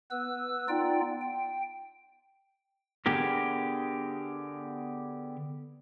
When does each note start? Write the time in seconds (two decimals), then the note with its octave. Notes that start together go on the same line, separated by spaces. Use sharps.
0.11 B3 B4 E6
0.68 B3 D#4 F4 D5 G5
1.21 G5
3.06 D3 B3 G4 G#4 A#4